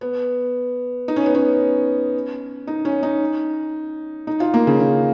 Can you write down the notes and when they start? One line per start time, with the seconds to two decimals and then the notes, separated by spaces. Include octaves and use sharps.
0.01 B3
1.08 D#4
1.16 C#4
1.26 B3
1.35 C#4
2.67 D#4
2.85 C#4
3.03 D#4
4.27 D#4
4.40 F4
4.54 A#3
4.67 C#3
4.80 C#3